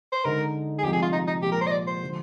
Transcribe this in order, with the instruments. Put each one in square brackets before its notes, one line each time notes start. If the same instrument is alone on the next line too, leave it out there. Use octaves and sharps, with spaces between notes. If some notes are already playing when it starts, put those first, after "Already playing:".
[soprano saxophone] C5
[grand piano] D3 G#3 D#4 [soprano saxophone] A#4
[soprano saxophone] G#4
[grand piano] C2 C3 F3 G#3 [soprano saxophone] G4
[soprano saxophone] G#4
F4
D#4
D#4
[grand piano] A#2 F3 G#3 [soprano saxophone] G4
[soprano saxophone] A#4
C5
D#5
D5
C5
[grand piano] D3 F3 G#3